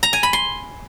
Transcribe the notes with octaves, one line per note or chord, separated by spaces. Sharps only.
A#5
G#5
B5
C6